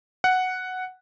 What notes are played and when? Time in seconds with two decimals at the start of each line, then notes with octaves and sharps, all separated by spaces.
0.24 F#5